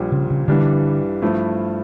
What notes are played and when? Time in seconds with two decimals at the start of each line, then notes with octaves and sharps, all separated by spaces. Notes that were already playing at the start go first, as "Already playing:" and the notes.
Already playing: A#1 A#2 G3
0.12 C#3
0.30 C#3
0.48 G2 D3 E3 G3 D4
1.22 G2 F3 A3 E4